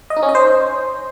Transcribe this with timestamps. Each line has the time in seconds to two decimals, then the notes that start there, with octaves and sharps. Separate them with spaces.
0.10 D#5
0.16 D#4
0.23 C#4
0.29 D#5
0.35 C5